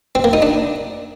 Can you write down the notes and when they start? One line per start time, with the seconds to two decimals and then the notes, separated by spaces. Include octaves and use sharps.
0.15 C4
0.24 A#3
0.33 D#4
0.42 D4